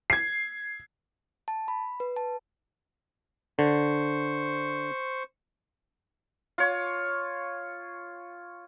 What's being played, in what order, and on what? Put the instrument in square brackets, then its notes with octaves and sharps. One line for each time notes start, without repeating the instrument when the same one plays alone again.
[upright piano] G#6 C7
[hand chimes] A5
B5
B4
A5
[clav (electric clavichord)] D3 [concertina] C5 C#6
[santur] F4 C#5